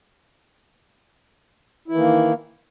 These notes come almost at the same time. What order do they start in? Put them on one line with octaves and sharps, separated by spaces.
E4 E3 D#3 A#3